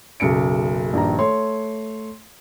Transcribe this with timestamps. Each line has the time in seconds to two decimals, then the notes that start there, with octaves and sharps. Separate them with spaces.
0.20 F#1 B1 C#3 C#7 D7
0.93 A#1 G2 D#3 A#5
1.19 A3 C#5 C6